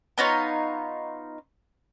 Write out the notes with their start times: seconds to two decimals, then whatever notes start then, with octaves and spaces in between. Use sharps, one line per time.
0.18 B3 D#4 F4 C#5